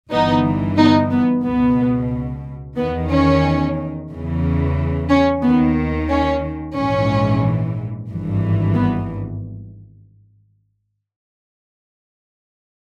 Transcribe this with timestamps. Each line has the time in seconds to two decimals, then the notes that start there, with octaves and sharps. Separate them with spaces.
0.11 G1 G2 E3 B3 D#4
0.78 B3 D#4
1.11 B3
1.44 C#2 B2 B3
2.77 E2 D#3 B3
3.10 C#4
4.10 E2 C#3 E3
5.09 C#4
5.43 D#2 D#3 B3
6.09 C#4
6.75 A#1 G#2 E3 C#4
8.08 G#1 G2 E3
8.75 B3